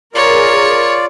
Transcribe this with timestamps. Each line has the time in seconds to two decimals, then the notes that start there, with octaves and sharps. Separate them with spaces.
0.15 F4 G#4 A#4 C#5 D5